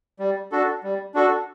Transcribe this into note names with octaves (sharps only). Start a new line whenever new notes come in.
G3
D4 F#4 A4
G3
D4 F#4 A4